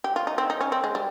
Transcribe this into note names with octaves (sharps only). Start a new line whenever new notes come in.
G4
F4
D#4
C4
D#4
C#4
C4
G#3
G3